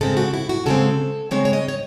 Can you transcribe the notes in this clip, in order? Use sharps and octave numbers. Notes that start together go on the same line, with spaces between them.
C#3 G#3 C4 A4
F#4
E4
F#4
C#3 G#3 C4 A4
C#3 G#3 C4 C#5
C#5
D#5
C#5